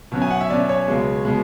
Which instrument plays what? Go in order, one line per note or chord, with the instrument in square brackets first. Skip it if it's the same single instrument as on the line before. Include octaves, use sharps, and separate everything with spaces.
[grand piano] B2 F#3 C#4
G#5
F#5
E5
B2 F#3 C#4 D5
C#5
C#2 B2 G#3
B2 G#3